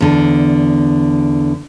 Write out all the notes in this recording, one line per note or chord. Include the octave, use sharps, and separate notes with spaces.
E2 D3